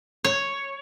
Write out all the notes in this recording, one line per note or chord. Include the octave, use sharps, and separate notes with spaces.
C#5